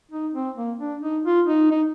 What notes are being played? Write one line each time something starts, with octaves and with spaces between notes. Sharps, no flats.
D#4
C4
A#3
D4
D#4
F4
D#4
D#4